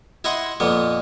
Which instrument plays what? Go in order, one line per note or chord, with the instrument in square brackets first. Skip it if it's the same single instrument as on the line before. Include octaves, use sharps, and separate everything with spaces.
[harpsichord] E4 D#5 E5 F#5 C6
F2 A#2 B3